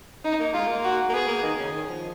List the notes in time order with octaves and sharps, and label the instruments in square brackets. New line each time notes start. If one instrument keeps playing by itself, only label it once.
[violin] D#4
[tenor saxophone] A#3
[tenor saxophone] G#3 [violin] F4
[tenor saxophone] A#3
[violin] F#4
[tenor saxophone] A#3
[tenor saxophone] B3 [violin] G#4
[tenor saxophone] A#3
D#3
C#3
D#3
F3